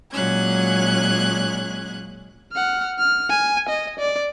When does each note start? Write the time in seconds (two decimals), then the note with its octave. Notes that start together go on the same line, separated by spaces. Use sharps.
0.11 A#2 F#3 G#3 C#4 F#6 G#6
2.52 F#5 F6
2.98 F6
3.29 G#5
3.69 D#5
3.99 D5